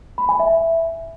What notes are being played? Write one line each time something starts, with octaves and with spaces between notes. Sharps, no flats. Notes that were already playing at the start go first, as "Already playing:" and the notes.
B5
G#5
E5